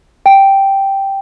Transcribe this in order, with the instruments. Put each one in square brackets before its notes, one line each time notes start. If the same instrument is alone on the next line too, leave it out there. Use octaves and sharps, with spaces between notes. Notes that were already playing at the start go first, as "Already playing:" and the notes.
[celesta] G5